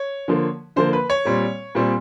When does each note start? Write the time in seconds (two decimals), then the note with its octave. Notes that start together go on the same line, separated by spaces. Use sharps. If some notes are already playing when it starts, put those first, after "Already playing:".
Already playing: C#5
0.28 D3 F3 A#3
0.76 D3 F3 A#3 C5
0.93 B4
1.10 C#5
1.25 A#2 G3 C4
1.75 A#2 G3 C4